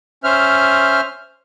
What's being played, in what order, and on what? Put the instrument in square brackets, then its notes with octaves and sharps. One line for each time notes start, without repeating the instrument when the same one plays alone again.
[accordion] C#4 C5 E5 F6